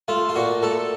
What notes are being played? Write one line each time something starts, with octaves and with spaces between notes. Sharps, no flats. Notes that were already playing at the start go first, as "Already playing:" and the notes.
A3 F4
F4
A#2 F#4
A3 A4